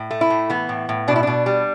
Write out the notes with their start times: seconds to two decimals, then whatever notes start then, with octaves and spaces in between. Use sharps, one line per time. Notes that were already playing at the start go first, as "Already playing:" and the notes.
Already playing: A2
0.11 A3
0.21 E4
0.30 A2
0.50 E3 B3
0.69 A2
0.89 A2
1.08 B2 D4
1.16 E4
1.23 B2 D4
1.46 G3